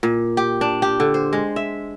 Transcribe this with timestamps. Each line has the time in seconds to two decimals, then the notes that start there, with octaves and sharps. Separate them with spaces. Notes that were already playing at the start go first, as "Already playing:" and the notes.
0.03 A#2
0.37 G4
0.61 D4
0.82 G4
1.00 D3
1.14 C5
1.33 G#3
1.56 E5